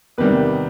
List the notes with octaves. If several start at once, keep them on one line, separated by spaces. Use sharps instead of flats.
E2 C3 D#3 G3 B4